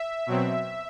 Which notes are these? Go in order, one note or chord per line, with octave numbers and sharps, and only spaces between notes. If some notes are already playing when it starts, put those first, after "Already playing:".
Already playing: E5
B2 F#3 C4